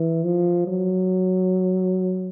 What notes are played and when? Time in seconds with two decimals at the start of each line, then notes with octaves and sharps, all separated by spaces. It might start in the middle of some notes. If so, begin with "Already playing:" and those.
Already playing: E3
0.24 F3
0.67 F#3